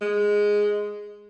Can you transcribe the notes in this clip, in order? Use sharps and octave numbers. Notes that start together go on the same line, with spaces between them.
G#3